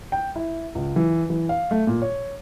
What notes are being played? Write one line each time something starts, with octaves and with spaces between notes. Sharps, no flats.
G5
E4
C#2
E3
E3
F5
A3
A#2
C#5